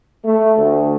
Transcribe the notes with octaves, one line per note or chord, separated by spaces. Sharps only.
A3
D2